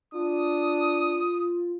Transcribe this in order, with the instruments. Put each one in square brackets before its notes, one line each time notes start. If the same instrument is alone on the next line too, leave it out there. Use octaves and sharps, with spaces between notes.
[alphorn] D4 [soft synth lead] F4 [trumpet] D#6